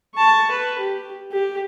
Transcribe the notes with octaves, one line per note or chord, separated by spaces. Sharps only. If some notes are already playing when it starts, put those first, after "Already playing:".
A5 C#6
B4
G4
G4